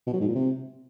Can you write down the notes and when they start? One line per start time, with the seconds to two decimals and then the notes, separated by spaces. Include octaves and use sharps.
0.06 B2
0.13 F#3
0.21 G#2
0.28 A#2
0.35 C3